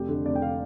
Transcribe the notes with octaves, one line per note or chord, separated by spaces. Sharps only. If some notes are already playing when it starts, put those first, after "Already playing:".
Already playing: F1 G4
F2 D3
F1 D5
G5
D3 F5